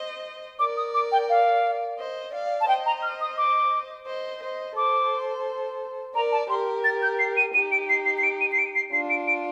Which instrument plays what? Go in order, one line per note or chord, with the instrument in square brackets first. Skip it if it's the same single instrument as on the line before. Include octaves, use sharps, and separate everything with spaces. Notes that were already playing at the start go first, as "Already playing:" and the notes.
Already playing: [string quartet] C5 D#5
[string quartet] A#4 D5 [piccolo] D6
[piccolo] D#6
D6
G5
F5
[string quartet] C5 D#5
D5 F5
[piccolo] A5
[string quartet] C5 D#5 [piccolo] G5
[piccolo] A#5
F6
D#6
D6
[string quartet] C5 D#5
C5 D#5
[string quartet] A4 C5 [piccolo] D6
[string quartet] A#4 D5 [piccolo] A#5
[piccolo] A5
[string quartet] G4 A#4 [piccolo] C6
[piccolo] A6
G6
C7
D#7
[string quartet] D#4 G4 [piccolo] D#7
[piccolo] D7
C7
C7
C7
D7
D#7
C7
D7
C7
[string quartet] D4 F4 [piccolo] C7
[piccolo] D7
D7